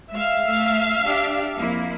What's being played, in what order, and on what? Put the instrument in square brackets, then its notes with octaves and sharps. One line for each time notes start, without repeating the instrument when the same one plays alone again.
[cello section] G#3 [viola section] E5 F5
[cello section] A3
D4 G4
F2 A#3 E4